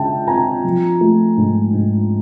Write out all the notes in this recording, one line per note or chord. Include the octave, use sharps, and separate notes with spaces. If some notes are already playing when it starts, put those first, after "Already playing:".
Already playing: C#3 G#3 E5 G5 A5
C4 G#5 A#5
F3
A3
G#2
G#2